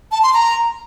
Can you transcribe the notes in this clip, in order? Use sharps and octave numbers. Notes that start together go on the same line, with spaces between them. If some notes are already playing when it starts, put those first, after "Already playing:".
A5
C6
A#5